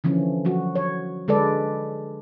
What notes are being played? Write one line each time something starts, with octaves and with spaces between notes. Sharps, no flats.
D3 E3 F3 C#4
F3 F#3 F#4
C#5
D3 G#3 A4 B4 D5